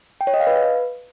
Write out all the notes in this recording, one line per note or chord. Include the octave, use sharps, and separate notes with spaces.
G5
C#5
D#5
F5
B4